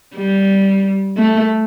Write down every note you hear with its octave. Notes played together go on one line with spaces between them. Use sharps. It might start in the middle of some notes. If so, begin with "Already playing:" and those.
G3
A3